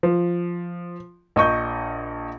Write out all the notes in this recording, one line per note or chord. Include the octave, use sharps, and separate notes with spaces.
F3
A#1 D#5 C#6 G6